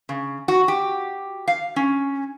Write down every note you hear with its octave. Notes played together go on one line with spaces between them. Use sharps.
C#3
F#4
G4
F5
C#4